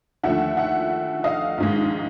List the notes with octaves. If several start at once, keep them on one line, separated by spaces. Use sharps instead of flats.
D#2 D3 F3 A3 E5 F#5
E5 F#5
D#5 F5
A#1 G#2 D#3 G#3